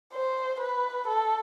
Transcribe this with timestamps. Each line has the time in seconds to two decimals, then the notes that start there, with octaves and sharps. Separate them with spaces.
0.13 C5
0.60 B4
1.07 A4